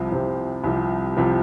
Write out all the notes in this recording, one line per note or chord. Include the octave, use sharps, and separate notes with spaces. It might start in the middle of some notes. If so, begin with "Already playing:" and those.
Already playing: C2 C3 F3
C2 C3 F3 C5
C2 C3 F3
C2 C3 F3